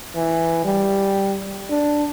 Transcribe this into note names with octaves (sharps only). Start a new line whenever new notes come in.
E3
G3
D4